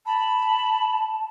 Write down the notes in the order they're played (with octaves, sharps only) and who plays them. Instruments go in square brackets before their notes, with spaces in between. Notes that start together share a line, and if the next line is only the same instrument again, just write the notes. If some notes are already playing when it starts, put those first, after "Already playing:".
[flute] A5 [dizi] B5